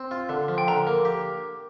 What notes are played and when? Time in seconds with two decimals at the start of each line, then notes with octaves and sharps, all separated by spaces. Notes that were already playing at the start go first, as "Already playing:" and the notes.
Already playing: C4
0.11 F4
0.29 D3
0.48 F3
0.58 G5
0.68 D3 A#5
0.87 A#3
1.05 G4